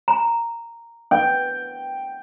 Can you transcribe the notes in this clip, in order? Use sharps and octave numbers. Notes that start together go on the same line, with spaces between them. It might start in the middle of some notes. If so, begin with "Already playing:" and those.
A#5
G5